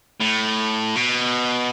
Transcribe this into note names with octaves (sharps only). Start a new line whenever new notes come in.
A2
B2